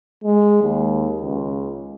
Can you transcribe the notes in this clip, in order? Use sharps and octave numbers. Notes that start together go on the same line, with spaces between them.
G#3
D#2
C#2